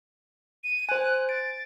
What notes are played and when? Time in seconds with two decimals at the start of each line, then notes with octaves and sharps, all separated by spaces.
0.64 D#7
0.89 C5 G#5 F#6
1.29 A6 D7